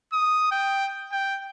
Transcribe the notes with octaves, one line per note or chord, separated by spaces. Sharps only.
D#6
G5
G5